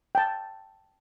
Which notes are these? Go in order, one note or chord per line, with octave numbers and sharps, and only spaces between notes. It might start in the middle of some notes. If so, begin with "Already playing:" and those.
G5 A5